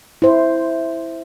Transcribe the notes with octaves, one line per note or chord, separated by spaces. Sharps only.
E4 C5